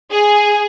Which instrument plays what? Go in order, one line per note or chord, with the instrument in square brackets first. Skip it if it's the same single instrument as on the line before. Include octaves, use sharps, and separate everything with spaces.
[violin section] G#4